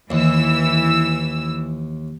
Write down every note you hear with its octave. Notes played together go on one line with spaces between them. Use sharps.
D#2 E3 E6